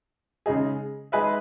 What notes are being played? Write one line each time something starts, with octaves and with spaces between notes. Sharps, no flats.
C#3 G#3 D#4 G#4
G#3 D#4 G#4 B4 E5